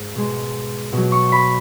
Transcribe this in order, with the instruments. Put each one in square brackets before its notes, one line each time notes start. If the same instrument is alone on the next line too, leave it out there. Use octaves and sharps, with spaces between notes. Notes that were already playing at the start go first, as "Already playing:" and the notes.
Already playing: [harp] G#2
B2 G#3
B2 F#3
C#6
B5